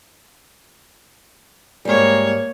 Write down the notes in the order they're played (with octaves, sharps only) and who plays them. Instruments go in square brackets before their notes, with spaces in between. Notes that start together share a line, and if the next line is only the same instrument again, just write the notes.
[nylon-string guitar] G#2 G3 [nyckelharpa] A#3 C#5